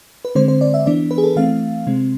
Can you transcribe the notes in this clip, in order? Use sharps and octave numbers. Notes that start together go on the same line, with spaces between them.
B4
D3 G#3 C4 C5
C5
D5
E5
E3 B3 D4 D5
B4
G#4
A4
E3 A3 C4 F5
C3 G#3 C4